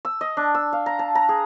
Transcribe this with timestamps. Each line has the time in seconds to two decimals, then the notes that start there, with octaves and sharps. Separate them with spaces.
0.05 E6
0.21 D#5
0.37 D4
0.55 E6
0.73 F5
0.86 A#5
0.99 A5
1.15 A#5
1.29 G#4